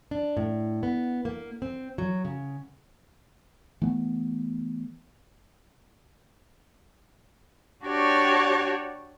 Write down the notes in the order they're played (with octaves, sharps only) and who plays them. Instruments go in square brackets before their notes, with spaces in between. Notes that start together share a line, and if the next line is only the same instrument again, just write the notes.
[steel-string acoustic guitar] D4
A2
B3
A#3
C4
F#3
C#3
[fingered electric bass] E3 A3 B3
[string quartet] D4 F#4 G4 C#5 D5